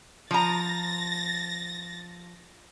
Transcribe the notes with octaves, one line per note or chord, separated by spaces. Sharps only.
F3 A#5 A6 A#6